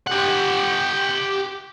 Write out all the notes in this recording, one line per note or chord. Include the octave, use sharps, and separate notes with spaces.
G4 F#5